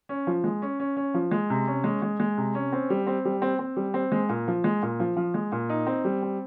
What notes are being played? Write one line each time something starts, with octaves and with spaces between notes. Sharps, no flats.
C#4
F3
G#3
C#4
C#4
C#4
F3
G#3
C3
C#4
G#3
G#3
G#3
C3
C#4
C4
G3
C4
G3
C4
C4
G3
C4
G#3
A#2
F3
G#3
A#2
F3
F3
G#3
A#2
D#4
C4
G3
C4